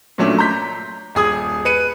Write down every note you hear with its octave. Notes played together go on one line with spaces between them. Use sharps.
A#2 F#3 A3 C#4 D4
A#5 C6 G6 B6
D#1 G#4 D#6 G#6
B4 C#7 D#7